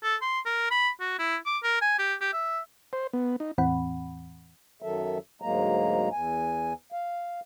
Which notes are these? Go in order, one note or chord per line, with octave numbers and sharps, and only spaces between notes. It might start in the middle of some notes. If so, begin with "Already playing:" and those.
A4
C6
A#4
B5
F#4
E4
D6
A#4
G#5
G4
G4
E5
C5
B3
D#4
E2 A2 E3 C4 F#5 B5
F#2 D#3 F#3 A4 E5
D2 G#2 F#3 G#3 A#3 A#5
E2 G#5
F5